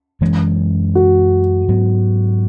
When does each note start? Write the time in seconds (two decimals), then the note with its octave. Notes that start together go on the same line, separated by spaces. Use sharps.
0.21 F#2 E3 G#3 C#4
0.95 F#4
1.68 G#2 F#3 B3